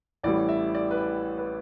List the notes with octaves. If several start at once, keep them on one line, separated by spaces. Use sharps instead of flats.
A1 A2 E3 G3 D5
E5
D5
B4
D5
B4